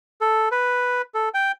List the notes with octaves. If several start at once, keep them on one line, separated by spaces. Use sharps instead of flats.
A4
B4
A4
G5